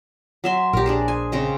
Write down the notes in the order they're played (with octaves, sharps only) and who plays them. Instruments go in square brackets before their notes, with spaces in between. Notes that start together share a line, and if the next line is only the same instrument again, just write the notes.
[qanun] F#3 E5 C6
[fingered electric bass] A#1 [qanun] G4 A#4
[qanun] D4 G#4 C5
G#5
C#3 C4 D#5